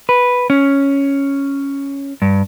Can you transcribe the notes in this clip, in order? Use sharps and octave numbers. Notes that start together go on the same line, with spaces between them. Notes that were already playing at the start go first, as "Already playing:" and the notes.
B4
C#4
G2